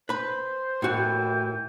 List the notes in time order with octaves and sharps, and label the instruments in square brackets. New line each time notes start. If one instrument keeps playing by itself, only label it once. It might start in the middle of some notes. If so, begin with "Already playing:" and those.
[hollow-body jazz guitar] B4 B5 [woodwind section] C5
[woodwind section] D#2 E3 G5 [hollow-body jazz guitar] A2 F#4